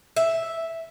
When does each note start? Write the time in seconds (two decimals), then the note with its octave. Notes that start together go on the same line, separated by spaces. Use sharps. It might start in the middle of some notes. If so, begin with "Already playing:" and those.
0.16 E5